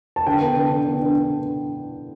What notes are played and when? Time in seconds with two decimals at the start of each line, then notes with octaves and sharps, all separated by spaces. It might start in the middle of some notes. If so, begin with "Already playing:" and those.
0.16 A5
0.27 D3 G5
0.41 B3
0.56 D3
0.72 D4
0.87 B3
1.02 D4